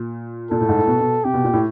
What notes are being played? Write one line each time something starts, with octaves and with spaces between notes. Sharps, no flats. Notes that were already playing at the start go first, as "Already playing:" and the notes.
Already playing: A#2
A#2 A4
A2
G#2
A2
B2
B2
C3 G4
B2
A#2
A2